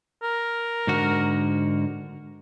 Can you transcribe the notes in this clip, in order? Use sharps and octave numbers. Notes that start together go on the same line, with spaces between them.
A#4
G#2 D3 F#4